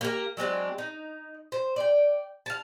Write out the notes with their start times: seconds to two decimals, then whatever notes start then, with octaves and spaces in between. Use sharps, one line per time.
0.01 A#3 G4 A#4
0.37 F#3 G#3 C4 D4
0.78 D#4
1.52 C5
1.76 D5 G5
2.46 F5 A5